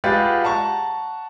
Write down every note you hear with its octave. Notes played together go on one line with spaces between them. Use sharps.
G#3 F4 G4 B4 F#5 A6
F#5 A5 A#5 C#6